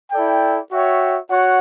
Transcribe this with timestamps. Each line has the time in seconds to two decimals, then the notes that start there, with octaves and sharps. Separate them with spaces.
0.12 E4 A4 D5 G5
0.71 F#4 C#5 E5 G5
1.30 F#4 C#5 F#5